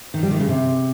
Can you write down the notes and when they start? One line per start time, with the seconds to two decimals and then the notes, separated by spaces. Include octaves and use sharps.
0.14 D#3
0.23 G3
0.31 D#3
0.40 C#3
0.49 C3